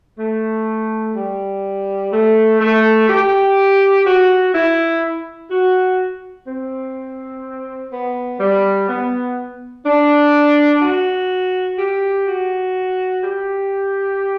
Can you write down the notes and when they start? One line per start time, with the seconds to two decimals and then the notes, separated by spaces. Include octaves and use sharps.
0.18 A3
1.14 G3
2.11 A3
2.60 A3
3.08 G4
4.05 F#4
4.54 E4
5.50 F#4
6.46 C4
7.92 B3
8.39 G3
8.88 B3
9.85 D4
10.82 F#4
11.78 G4
12.27 F#4
13.23 G4